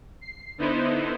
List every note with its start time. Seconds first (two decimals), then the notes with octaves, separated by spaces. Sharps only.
0.21 C7
0.58 D3 B3 D#4 E4 C5